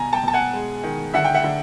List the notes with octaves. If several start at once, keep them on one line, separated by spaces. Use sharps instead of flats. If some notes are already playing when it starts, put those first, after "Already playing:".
Already playing: B2 G#5 A#5
G5 A5
B2 A5
F#5 G#5
G#3
D#3
D3 E5 F#5
G5
E5 F#5
D3